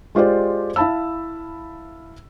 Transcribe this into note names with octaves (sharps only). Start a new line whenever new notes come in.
G#3 F4 G4 C5 D5
E4 F5 A5 B5 E6